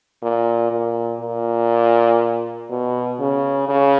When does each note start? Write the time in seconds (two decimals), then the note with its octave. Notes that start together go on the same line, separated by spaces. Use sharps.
0.22 A#2
0.71 A#2
1.21 A#2
2.70 B2
3.20 C#3
3.69 C#3